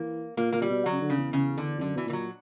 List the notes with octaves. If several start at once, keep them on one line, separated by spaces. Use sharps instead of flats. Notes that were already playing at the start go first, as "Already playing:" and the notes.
Already playing: E3 A#3
A#2 A#3
A#2 A#3
G3
B2
F#3
C#3
D3
C#3
E2
C#3
D3
E2
F#2 D3
B2 E3
A#2 E3
F#3